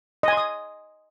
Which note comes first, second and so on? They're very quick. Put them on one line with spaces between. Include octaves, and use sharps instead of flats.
D#5 G#5 C6 D#6